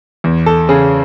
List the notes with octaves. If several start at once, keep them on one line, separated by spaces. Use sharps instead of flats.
E2
A4
C#3 G#4